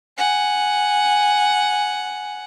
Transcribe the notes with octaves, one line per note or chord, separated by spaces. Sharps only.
F#5 G#5